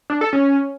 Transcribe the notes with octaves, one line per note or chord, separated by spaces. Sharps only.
D4
A4
C#4